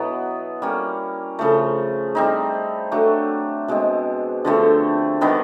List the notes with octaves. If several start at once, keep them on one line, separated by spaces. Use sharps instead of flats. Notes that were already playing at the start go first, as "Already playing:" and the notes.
Already playing: B2 F#3 B3 E4
G3 A#3 C#4
C#3 F3 A3
G3 C4 D#4
F#3 A3 D4
B2 G#3 C4
D3 F3 A3 C4
D#3 G3 B3 D4